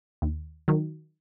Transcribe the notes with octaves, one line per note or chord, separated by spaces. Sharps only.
D#2
D#3 F#3